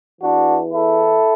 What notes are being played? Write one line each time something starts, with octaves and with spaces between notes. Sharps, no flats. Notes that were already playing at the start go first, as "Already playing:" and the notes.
E2 E3 D4 F#4
E4 A4